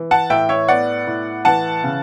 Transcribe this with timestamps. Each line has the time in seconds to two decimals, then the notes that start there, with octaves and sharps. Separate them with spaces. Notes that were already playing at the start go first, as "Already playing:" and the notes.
Already playing: E3
0.11 F#5 A5
0.30 A2 E5 G5
0.49 C#5 E5
0.68 B3 D5 F#5
1.07 A2
1.45 E3 F#5 A5
1.84 C#3